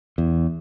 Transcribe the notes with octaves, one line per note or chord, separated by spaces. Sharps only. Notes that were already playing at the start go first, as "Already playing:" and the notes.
E2